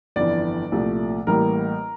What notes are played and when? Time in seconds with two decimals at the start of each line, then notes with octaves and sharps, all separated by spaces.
0.16 G1 F2 E3 D5
0.72 C2 A#2 F3 A3
1.27 A1 A2 E3 G3 A#3 A#4